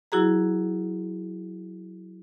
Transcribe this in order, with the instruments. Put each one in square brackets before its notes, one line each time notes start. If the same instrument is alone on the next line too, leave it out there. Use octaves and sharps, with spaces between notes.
[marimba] F#3 E4 F#4 G#4 A#5